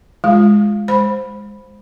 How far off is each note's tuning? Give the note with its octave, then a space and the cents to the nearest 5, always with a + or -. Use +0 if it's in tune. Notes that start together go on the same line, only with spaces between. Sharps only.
G#3 +0 F4 +0
G#3 -25 C5 +0 B5 +0